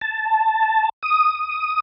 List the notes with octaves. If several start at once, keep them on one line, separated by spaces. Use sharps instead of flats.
A5
D#6